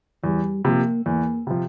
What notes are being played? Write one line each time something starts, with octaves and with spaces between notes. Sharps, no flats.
E2 G3
C3 F3 A#3
E2 A#3
C3 F3